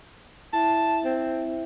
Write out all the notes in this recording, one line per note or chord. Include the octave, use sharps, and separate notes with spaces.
E4 E5 A5
C4